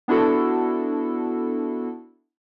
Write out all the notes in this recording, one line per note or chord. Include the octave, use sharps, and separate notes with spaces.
B3 D4 E4 F#4 A4